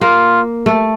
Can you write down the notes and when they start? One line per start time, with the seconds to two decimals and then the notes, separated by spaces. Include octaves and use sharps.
0.01 A#3 F4
0.66 A3